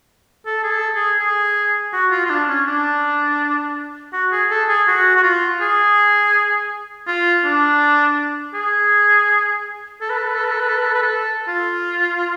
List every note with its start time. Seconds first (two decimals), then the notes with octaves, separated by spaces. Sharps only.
0.46 A4
0.63 G#4
0.71 A4
0.95 G#4
1.19 G#4
1.93 F#4
2.11 F4
2.26 F4
2.30 D4
2.48 C#4
2.67 D4
4.13 F#4
4.32 G#4
4.50 A4
4.69 G#4
4.87 F#4
5.16 F#4
5.23 F4
5.61 G#4
7.07 F4
7.44 D4
8.54 G#4
10.01 A4
10.10 B4
10.18 A4
10.27 B4
10.34 A4
10.44 B4
10.51 A4
10.60 B4
10.69 A4
10.78 B4
10.86 A4
10.94 B4
11.02 A4
11.48 F4